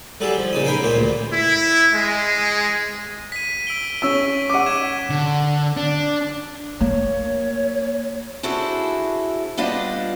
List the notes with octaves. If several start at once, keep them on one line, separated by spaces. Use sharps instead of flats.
F#3 G3 G#4 A4
F3
A#1 C#3 D#4 D#6
F5 G5 G#5 A#5 B5
C#2 A#2 A#3 C5
D2
E4
G#3
B6 D#7
E6 D7 G7
C#4 C#6 E6 G7
F#5 D6 D#7
G#6 B6 E7
D3
D4
A#3 C#5
D4 E4 F#4 G#4 A4 C5
G3 B3 D4 F4 D5 D#5